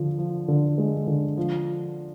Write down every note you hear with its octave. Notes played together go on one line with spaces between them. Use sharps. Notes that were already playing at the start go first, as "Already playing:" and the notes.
Already playing: D3 F3
F3
D3
G#3
D3
F3